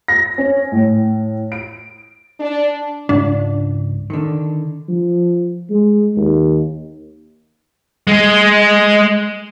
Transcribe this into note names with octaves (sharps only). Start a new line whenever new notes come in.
A#6
C#4
A2
D7
D4
C#2 G#2 D4
D3 D#3
F3
G#3
D#2
G#3 G#4